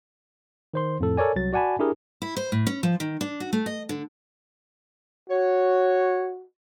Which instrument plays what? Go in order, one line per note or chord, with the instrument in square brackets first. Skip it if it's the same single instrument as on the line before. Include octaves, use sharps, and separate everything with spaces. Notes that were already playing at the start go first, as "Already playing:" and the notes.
[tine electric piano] D#3 C5 C6
F2 A2 A4
A4 A#4 C#5 D5 G#5
C2 F#3 A6
F#4 D5 F#5 G#5 A5 B5
D4 E4 G4 G#4 A#4
[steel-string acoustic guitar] E4
C5
A2
C#4
F3
D#3
D4
F#4
A3
D#5
D3
[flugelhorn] F#4 [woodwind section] C#5